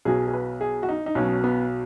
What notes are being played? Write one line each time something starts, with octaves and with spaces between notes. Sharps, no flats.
B1 B2 F#3 G#4
G#4
B4
G#4
F#4
D#4
D#4
B1 B2 F#3 C#4
B3